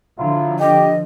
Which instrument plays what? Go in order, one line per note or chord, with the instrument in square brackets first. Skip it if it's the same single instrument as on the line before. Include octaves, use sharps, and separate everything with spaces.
[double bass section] D3 F3 [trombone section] F#3 E4 F4
[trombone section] G4 [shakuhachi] D#5